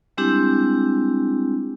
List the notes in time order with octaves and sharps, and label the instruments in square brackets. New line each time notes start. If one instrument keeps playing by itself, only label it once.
[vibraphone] G3 G#3 C4 D4 E4 G4